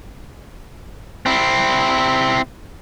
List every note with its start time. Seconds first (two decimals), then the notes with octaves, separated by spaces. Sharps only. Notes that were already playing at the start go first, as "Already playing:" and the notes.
1.26 C4 E4